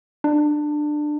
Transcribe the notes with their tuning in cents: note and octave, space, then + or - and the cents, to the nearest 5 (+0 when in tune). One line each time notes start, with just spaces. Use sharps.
D4 +20